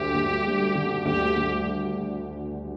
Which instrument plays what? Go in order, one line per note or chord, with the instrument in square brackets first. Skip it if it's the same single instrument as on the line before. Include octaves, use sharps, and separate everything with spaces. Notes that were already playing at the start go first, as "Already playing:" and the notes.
Already playing: [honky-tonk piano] D2 D3 G3 [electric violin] G4
[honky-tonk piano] D2
G3
D3
[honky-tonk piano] D2 [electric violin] G4
[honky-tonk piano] D2